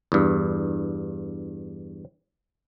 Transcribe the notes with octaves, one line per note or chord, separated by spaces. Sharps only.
E2 G2